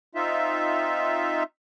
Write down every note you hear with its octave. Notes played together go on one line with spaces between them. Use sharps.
C4 D#4 F4 E5